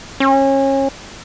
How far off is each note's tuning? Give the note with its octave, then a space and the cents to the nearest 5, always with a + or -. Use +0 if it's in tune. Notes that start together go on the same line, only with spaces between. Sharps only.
C#4 -30